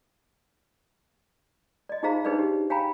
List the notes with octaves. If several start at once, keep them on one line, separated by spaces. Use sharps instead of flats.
D5 D#5
D#4 F4 G#4 C5 F5 A#5
D4 D#4 G#4 B4 C5 D5
G4
C#5 F5 G5 G#5 A#5 B5